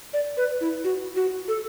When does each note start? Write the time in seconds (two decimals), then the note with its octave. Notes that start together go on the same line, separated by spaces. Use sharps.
0.13 D5
0.37 B4
0.61 E4
0.84 F#4
1.16 F#4
1.48 A4